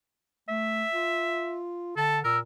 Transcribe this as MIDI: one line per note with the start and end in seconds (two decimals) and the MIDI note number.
0.49 0.84 57
0.49 1.59 76
0.92 1.96 65
1.97 2.20 50
1.97 2.19 69
1.97 2.20 81
2.24 2.41 46
2.24 2.38 70
2.24 2.39 88